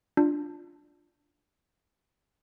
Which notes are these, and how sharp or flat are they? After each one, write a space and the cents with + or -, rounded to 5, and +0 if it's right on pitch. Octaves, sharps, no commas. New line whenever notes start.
D4 +5 F4 +0